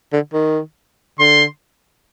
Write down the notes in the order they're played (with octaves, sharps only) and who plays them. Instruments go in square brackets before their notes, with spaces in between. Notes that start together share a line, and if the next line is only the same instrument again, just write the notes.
[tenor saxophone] D3
D#3
[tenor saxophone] D3 [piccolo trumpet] C6